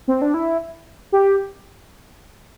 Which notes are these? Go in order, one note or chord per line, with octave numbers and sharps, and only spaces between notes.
C4
D4
E4
G4